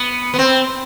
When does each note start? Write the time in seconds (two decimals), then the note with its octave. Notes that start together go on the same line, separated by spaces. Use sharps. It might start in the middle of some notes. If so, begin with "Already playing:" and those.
Already playing: B3
0.34 B3
0.39 C4